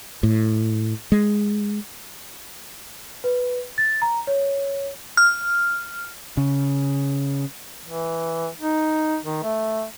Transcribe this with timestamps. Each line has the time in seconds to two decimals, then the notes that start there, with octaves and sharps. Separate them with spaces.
0.23 A2
1.12 G#3
3.24 B4
3.78 A6
4.02 A#5
4.27 C#5
5.17 F6
6.37 C#3
7.85 E3
8.60 D#4
9.25 D#3
9.43 A3